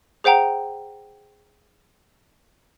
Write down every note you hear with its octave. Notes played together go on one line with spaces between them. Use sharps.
G#4 C5 F#5 G5 A#5